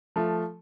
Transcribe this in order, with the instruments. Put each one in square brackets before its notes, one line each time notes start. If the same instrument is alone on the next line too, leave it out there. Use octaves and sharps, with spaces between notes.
[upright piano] F3 A3